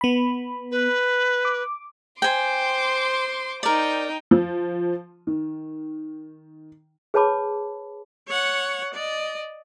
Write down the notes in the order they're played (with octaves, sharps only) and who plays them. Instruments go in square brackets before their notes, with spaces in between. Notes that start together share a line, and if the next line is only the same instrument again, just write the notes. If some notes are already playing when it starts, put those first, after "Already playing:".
[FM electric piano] B3 B5
[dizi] B4
[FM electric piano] D6
[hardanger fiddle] C5 [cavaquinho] G5 G#5 [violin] C6 D6
[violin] D#4 G5 [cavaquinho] A#4 D5
[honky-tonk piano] F3
D#3
[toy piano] G#4 B4 C#5 A5 B5 D6
[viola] C#5 F#5
D5 D#5